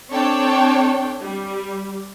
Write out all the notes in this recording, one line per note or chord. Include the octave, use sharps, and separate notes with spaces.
C4 D4 A4 C#5 G5
G3